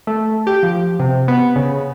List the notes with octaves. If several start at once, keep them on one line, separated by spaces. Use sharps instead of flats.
A3
G4
F3
C3
B3
C#3